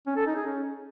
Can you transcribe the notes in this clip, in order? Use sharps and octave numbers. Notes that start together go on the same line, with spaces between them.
C#4
A4
D#4
G#4
C#4